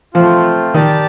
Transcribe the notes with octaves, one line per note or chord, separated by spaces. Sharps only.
F3 A3 C4 F4
D#3 G4 D5 A5